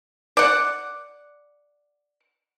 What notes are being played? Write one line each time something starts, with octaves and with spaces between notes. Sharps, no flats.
D5 F#5